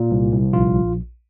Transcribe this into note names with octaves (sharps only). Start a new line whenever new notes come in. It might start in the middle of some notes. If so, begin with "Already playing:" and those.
Already playing: A#2
C2
C2
A#1 F4